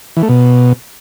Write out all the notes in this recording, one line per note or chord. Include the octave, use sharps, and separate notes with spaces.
E3
A3
B2